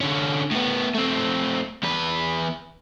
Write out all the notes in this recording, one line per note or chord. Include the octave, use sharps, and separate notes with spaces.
D3 C#4
A2 B3
A3 C4
E2 B4